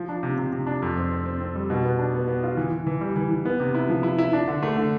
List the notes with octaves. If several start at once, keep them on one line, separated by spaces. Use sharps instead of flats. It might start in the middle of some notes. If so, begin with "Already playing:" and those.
Already playing: F3
D4
C3
C3
C3
D4
F2
C4
C4
C4
C4
G3
B2
B3
D4
B3
B3
F4
E3
E3
E3
G3
E3
E3
B3
C3
E4
F3
E4
E4
D4
D3
A3
D3